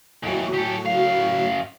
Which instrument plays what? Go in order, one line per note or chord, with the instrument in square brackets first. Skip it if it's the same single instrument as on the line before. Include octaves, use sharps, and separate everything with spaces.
[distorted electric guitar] D#2 E3 [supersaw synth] A2 F#3 F#4
[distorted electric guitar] G4 A4
F#2 F5